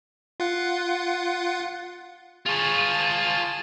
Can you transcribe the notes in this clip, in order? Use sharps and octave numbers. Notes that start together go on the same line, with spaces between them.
F4 F#5
F4 G#4 C#5 A5